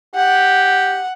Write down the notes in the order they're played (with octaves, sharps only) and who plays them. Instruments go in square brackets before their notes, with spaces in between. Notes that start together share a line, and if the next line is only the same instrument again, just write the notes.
[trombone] G4 [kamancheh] F#5